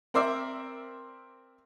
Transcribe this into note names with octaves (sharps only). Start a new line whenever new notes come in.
C4 A#4 C5 D5 E5